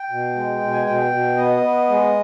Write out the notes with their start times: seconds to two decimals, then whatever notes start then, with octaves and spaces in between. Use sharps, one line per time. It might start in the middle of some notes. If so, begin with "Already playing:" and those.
Already playing: G5
0.10 B2
0.36 G#3
0.61 B2
0.73 G#5
0.86 B2 G5
1.12 B2
1.37 B3 D#5
1.63 B3
1.89 G#3